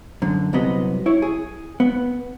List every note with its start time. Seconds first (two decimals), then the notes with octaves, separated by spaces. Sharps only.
0.22 F#2 D3
0.53 C2 F#2 C3 F#3 B3 D#5
1.06 E4 C#5
1.22 G#4
1.80 B3